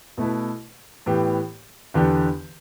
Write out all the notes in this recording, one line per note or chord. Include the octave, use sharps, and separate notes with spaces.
B2 A3 E4 B4
A2 E3 B3 G4
E2 D3 B3 D4 G4